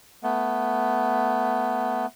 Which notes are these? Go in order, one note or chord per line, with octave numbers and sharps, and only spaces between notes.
A3 B3